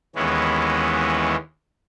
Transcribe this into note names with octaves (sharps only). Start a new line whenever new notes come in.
D#2 E3 G#3 B3 C#4